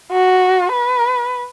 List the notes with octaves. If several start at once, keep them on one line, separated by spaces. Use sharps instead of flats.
F#4
B4